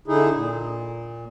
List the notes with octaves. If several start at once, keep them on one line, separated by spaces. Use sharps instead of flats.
D3 D#4 E4 G#4
A#2